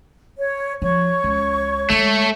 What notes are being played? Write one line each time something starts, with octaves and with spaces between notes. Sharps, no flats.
C#5
F3 C#5 C#6
C#2
D3 G#3 A3